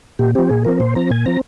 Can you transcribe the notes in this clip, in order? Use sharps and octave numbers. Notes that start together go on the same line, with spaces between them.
A#2 G4
F3 C4 G4
A#2 G#4
F3 C4 A#4
A#2 C5
F3 C4 A#5
A#2 G#5
F3 C4 A#5